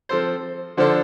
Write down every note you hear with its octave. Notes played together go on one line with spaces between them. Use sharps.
F3 C4 A4 C5
D3 F3 D4 A4 C5